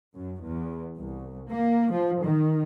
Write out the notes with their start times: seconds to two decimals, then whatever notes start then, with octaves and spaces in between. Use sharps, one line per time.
0.16 F#2
0.45 E2
0.95 C2
1.50 A#3
1.91 F3
2.21 D#3